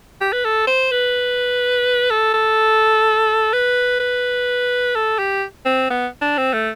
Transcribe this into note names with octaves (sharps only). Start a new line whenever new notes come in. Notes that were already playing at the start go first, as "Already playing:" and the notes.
G4
B4
A4
C5
B4
A4
A4
B4
B4
A4
G4
C4
B3
D4
C4
A3